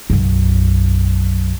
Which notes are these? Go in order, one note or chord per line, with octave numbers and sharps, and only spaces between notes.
B1 F#2